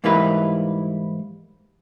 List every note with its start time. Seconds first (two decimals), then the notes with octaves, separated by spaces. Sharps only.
0.04 G#2 E3 G3 A#3 E4 B4